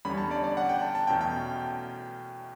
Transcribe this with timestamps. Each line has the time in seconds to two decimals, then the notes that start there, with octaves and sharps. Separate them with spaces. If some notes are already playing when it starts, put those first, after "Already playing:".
0.05 E2 D3 G3 C#4 B5
0.18 A5
0.31 D5
0.44 D5
0.57 F#5
0.69 G5
0.82 A5
0.95 A5
1.07 E2 B2 A3 C#4 G5
1.21 G5